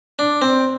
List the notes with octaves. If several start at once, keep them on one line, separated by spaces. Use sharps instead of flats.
D4
C4